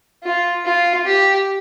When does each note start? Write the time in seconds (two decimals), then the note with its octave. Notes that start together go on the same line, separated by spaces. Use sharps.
0.23 F4
0.65 F4
1.06 G4